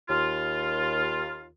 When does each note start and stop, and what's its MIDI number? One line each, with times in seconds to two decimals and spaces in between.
0.09 1.48 39
0.09 1.48 65